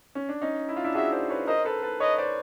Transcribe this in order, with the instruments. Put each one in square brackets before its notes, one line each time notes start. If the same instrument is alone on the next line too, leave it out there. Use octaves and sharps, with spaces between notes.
[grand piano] C#4
D4
C#4 D#4
E4
F4
D4 E4
[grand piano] F#4 G#4 [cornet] E5
[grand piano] C5 D5
B4 C#5
[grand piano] A#4 C5 [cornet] D#5
[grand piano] A4 B4
A4 B4
[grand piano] B4 C#5 [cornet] D#5
[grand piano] C5 D5